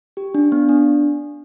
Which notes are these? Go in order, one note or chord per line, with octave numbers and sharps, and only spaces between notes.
G4
D4
B3
D4